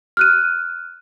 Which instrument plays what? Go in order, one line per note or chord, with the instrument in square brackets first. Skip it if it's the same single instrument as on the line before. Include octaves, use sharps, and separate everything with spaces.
[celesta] F6 F#6 D#7